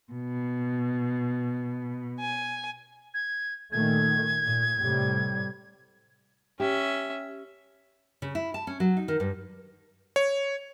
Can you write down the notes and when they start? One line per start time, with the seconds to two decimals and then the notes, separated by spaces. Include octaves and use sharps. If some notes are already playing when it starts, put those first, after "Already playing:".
0.12 B2
2.19 G#5
3.14 G#6
3.72 A#2 D#3 A3 G#6
4.43 A#2
4.80 A2 C3 G3
6.60 C#4 G4 E5
8.22 C#3
8.35 E4
8.54 A5
8.67 C#4
8.80 F#3
8.97 D#4
9.08 D#3
9.20 G2
10.16 C#5